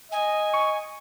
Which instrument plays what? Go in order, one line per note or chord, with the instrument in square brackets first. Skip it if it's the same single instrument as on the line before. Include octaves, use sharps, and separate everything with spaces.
[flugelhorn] D#5 [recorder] G#5
[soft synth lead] C#6